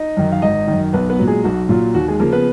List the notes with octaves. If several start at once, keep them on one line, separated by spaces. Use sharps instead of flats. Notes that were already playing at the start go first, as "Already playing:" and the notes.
Already playing: D#4 D#5
F#2 D#3
F5
G#1 D#4 D#5
F#2 D#3
B1 B3 B4
B3 B4
A#2 F#3
G#3 G#4
B1 F#4
A#2 F#3 F4
D#2 F#4
G#3 G#4
C#3 F3 A#3 A#4
B3 B4